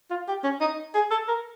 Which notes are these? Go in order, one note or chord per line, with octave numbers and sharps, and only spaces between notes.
F4
G4
C#4
D#4
G#4
A4
A#4